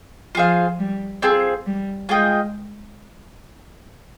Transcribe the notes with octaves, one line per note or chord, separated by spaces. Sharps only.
F3 F4 G#4 C5 F5
G3
C4 F4 G#4
G3
G#3 F4 G#4 D#5 G5